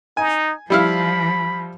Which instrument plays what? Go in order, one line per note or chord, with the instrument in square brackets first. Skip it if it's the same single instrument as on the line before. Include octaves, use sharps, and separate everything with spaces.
[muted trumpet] D#4 [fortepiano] G#5
[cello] F3 [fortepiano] G3 E4 F5 [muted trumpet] B5